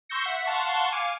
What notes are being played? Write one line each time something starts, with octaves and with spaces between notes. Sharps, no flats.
C6 C#6 E6 G6 A#6 C#7
E5 F#5 B6
F5 F#5 A5 C6 C#6
F5 G#5 D6 C#7 D#7